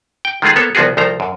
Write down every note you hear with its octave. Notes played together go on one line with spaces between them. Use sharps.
G5
D#3 G#3 A3 F4 G#4
A#3 B3 A4 C#5
C2 F3 B3 F#4 G#4
C2 F3 A3 C5 A#5
F#2